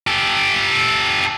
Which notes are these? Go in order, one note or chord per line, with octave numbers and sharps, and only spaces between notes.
G4 A4